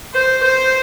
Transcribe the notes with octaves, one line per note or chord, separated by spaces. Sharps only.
C5
C5